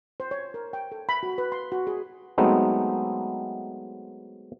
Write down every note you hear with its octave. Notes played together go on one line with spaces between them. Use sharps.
C5
C#5
A#4
G5
A4
B5
F#4
B4
C6
F#4
G#4
F#3 G#3 A3 B3 C4 D#4